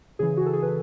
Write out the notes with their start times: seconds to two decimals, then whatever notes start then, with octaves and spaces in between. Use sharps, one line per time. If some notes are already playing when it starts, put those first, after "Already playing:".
0.19 C#3 E3 G#4
0.37 F#4
0.46 A4
0.53 G#4
0.63 B4